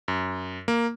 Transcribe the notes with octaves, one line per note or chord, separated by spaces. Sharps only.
F#2
A#3